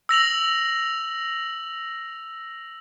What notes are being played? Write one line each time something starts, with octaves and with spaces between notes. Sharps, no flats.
E6 A#6 F7 F#7